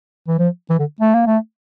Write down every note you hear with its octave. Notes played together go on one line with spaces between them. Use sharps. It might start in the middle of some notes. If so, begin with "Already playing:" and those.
E3
F3
E3
D3
A3
A#3
A3